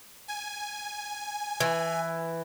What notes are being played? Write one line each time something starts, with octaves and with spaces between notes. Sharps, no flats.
G#5
E3